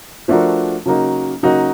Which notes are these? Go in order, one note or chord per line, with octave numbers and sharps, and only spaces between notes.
F3 A3 D4 F#4 A#4
C#3 F#3 A#3 D#4 F#4
C#3 F#3 A#3 D#4 F#4